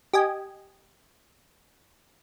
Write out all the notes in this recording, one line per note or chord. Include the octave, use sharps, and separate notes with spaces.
G4 D#5 G#5